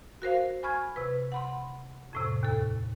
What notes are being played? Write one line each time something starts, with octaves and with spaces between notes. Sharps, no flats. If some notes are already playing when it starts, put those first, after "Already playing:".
F#4 A#4 C5 F5
G#5 B5 C#6 F6 G#6
C3 B4
F#5 B5 C6
F2 A2 C3
D#2 A4